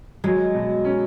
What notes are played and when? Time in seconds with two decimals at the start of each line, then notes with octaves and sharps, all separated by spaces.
0.24 F#3 G#3
0.54 B2
0.85 C#4